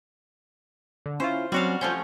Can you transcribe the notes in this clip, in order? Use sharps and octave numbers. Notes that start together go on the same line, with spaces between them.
D3
C#4 E4 F4 C5
F#3 G3 C4 C#4 F#4 F5
F3 A3 C#4 F4 C6 G6